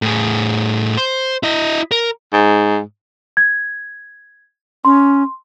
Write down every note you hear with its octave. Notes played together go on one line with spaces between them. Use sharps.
A2 G#4
C5
E4 D#5
A#4
G#2
G#6
C#4 C6